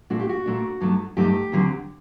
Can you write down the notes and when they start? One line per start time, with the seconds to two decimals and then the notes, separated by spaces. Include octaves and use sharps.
0.10 A#2 A3 D4 F#4
0.20 G4
0.29 F#4
0.46 A#2 A3 D4
0.81 G2 F#3 A3 D#4
1.17 G2 F#3 A3 D#4 G4
1.52 D#2 D3 F#3 C4